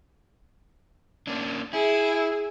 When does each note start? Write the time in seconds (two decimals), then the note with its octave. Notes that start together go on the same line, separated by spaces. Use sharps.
1.27 A#3 C#4 D4
1.73 E4 G#4